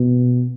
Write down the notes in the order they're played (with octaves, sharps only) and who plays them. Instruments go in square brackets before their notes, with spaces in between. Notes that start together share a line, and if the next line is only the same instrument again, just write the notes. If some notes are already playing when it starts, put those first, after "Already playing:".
Already playing: [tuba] B2